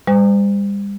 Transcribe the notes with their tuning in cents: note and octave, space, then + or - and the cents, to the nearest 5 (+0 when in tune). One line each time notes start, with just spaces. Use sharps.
G3 +35 C5 -40